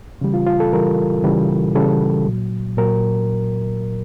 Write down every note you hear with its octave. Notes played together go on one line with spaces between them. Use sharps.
C#3 E3 G3
F4
F4
A4
C#3 E3 G3 A#4
C#3 E3 G3
C#3 E3 G3 A4
A#2 F#3
A#2 F#3 A#4